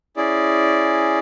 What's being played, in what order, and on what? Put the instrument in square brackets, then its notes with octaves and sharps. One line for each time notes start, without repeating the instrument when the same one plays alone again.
[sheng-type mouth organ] C#4 E4 G#4 D5